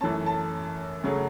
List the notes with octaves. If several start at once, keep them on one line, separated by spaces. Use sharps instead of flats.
F#2 E3 A3 C#4 A5
A5
F#2 C#3 F#3 A3